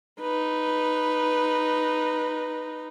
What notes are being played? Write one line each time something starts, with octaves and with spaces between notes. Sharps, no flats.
D#4 B4